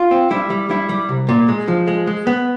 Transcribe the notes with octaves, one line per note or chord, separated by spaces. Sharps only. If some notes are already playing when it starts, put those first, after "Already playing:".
Already playing: F4
C4
G3 E4
G3
G3 E4
G3
C2
A#2
G#3
F3
G#3
G#3
B3